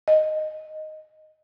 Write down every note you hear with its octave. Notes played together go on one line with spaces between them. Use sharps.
D#5